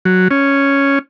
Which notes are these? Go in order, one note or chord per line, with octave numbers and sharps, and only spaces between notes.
F#3
C#4